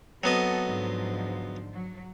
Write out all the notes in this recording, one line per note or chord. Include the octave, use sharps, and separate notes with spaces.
F#3 B3 C4 A4 D#5
G#2 D3 F3
F#3